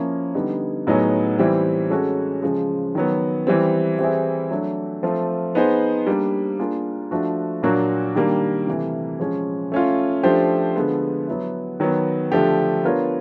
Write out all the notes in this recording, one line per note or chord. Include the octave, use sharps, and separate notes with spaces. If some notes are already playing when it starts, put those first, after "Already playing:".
Already playing: F3 A#3 C#4 E4
D3 G3 B3 D#4
A2 F#3 B3 D#4 G#4
E3 G3 C4 E4
G#3 C#4 F#4 A4
C#3 F3 G#3
D#3 F#3 B3
E3 G3 C4
E3 G3 C4 E4 G#4
F#3 A3 D4
F3 A3 C4 F4
B3 D#4 G#4 C5
G3 A#3 D4
A#3 D4 F4 G#4
F3 A3 D4 F#4
A#2 F#3 A#3 D4 F#4
D#3 G3 A#3 D4
C3 E3 A3
F3 G#3 C#4
A3 C#4 F4
F3 A3 D4 G4 C5
D3 F3 G#3 B3
F#3 B3 E4
D#3 F#3 B3
D3 F3 A3 D4 G4
B3 D4 F4 A#4 C#5